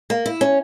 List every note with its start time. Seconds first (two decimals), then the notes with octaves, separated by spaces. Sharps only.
0.10 A#3
0.26 E4
0.41 C#4